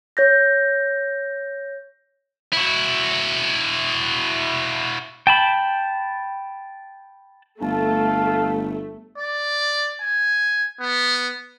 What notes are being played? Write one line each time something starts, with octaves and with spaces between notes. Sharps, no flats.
C#5 G6 A#6
E4 F#4
G5 A5 B5
G1 A3 F5 A5
D5
G#5
B3